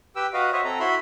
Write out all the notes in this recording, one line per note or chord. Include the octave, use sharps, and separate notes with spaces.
G4 B4 G5 E6
F#4 B4 D#5 F5
F#4 C5 C#5 D#5 E5
C4 A4 A#5
E4 F#4 E5 B5 C6